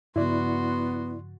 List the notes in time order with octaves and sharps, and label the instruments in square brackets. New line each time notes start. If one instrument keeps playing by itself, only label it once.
[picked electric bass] G2 C#3 F3 [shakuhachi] B3 [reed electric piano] E4 D5 [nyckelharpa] F#4 C6